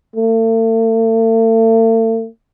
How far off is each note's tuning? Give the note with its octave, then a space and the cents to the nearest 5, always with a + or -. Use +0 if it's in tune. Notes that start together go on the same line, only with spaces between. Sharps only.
A3 +40